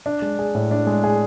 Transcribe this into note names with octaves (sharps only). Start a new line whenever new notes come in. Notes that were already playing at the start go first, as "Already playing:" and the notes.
D4
G#3
G#4
A2
D4
G#3
G#4